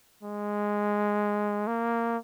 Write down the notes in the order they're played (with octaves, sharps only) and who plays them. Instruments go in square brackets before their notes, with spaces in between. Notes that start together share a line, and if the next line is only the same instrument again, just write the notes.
[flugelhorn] G#3
A#3